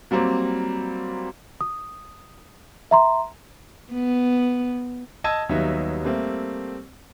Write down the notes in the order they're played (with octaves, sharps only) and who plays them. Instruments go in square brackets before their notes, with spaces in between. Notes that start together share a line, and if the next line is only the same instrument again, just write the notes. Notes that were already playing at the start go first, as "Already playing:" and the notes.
[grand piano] F#3 G3 A#3 C4
[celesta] D#6
E5 A#5 C6
[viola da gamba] B3
[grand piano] D#5 A5 E6 G#6 D#7
D#2 F#3 G3 B3 D#4 E5
G3 A3 A#3 C4